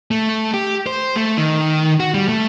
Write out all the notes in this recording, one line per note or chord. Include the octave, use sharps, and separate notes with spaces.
A3
G4
C5
A3
D#3
F#4
G3
A3